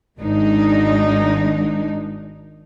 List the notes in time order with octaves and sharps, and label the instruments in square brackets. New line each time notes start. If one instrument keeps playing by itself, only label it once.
[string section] G#1 [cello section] G#3 D4 D#4